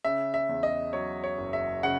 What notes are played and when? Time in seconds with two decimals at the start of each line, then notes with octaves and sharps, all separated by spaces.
0.04 C#3 E5
0.34 E5
0.49 E2
0.63 D#5
0.93 F#3 C#5
1.24 C#5
1.38 F#1
1.53 E5
1.83 C#3 F#5